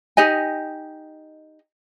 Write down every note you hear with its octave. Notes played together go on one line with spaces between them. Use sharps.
D#4 G4 D#5 G#5